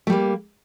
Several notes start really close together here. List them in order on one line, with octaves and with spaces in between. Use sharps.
A3 G3 A#3